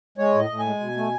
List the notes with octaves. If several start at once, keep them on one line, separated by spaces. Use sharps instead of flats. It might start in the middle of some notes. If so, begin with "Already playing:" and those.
G#3 C#5
A2 D#5
A2
G#5
G#3
B2
A3